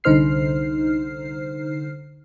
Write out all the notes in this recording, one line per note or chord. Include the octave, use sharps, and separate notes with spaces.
C2 D3 D#4 C5 F6 C7